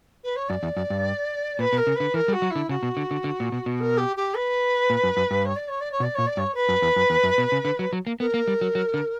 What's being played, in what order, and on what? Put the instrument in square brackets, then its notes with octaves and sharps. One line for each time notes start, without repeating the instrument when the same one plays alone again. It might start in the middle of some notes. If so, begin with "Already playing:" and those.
[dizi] B4
C#5
[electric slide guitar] F#2 [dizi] D5
[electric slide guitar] E2
F#2
G2
[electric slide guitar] A#2 [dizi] B4
[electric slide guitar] B2
[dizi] A#4
[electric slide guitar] C#3
[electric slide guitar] D3 [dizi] B4
[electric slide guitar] E3 [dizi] A#4
[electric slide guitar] G3
[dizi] F#4
[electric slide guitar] F#3
[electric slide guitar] D3 [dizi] E4
[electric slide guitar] C#3 [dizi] F#4
[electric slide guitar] B2
D3
D3
D3
A#2
B2
B2
[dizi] A#4
G4
G4
B4
[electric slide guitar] A#2
F#2
F#2
G2
[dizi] C#5
D5
C#5
D5
C#5
[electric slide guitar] B2
[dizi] D5
[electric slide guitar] A#2 [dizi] C#5
[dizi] D5
[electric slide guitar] G2 [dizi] C#5
[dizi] B4
[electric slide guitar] F#2
E2
F#2
E2
F#2
B2
C#3
D3
F#3
F#3
A#3
[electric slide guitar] B3 [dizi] A#4
[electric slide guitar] A#3
G3
F#3
F#3
D3